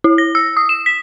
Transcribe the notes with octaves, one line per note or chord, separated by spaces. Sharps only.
E4
A#6
E6
D#6
E7
B6